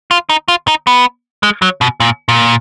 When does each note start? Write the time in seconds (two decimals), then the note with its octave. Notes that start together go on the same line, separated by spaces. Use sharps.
0.11 F4
0.30 D#4
0.48 F4
0.68 D#4
0.87 B3
1.43 G#3
1.62 F#3
1.81 B2
2.00 A#2
2.29 A#2